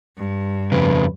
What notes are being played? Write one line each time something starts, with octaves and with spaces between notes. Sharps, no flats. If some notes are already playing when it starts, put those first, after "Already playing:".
G2
F2 C#3 B4